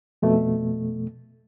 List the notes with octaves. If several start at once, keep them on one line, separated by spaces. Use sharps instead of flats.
F2 B2 A3